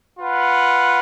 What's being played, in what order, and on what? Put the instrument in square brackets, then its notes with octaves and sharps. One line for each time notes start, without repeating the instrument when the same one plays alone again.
[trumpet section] F4 B4 F#5